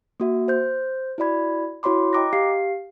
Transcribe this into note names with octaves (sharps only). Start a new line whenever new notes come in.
A#3 F#4 E5
C5 G6
E4 F#4 D5 B5 G#6
E4 F#4 C#5 B5 C6 D6
D#5 G5 A#5 D6 F#6 A#6
G4 F5 C7